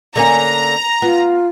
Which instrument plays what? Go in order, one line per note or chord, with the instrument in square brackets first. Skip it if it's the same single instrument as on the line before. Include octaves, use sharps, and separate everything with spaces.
[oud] D3 A#3 C#4 [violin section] A#5
[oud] B3 [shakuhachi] F4